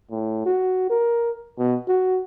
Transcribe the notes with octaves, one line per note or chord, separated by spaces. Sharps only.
A2
F#4
A#4
B2
F#4